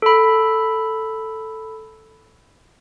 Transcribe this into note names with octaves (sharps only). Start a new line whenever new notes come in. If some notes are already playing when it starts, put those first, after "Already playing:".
A4 B5